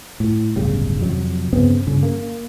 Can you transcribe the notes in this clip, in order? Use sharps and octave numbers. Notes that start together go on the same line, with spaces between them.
A2
D1 G1 C#3 G3
F2 C3 F#3
G2 C#3 B3 C4
G2 C#3
A#3